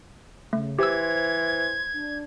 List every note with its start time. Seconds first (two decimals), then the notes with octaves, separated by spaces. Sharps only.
0.53 C#3 A3
0.79 E3 G4 C5 E6 G#6
1.94 D4